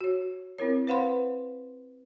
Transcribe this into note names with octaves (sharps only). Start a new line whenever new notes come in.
F#4 C#5
C4 E4 A#4 C#5
B4 C5 F5 F#5 B5 C6